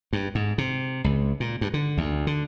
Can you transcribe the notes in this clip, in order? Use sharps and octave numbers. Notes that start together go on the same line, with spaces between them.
G2
G#2
C3
C#2
A#2
G2
D3
D2
D3